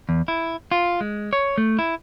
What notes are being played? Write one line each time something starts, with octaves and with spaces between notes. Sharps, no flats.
E2
E4
F4
G#3
C#5
A3
E4